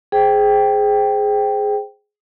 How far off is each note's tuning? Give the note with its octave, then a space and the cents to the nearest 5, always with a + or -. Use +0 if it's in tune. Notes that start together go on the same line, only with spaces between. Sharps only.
G#4 +5 C5 -5 G5 +0